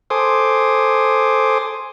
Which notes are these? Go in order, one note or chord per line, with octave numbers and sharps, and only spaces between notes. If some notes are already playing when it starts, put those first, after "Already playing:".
A4 C5 G#5 C6 D6 D#6